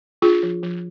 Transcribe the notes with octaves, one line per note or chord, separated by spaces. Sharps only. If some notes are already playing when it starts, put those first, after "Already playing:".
D4 F4 G#4
F3
F3